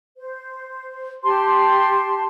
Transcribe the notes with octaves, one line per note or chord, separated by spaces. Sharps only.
C5
G4 A5 C6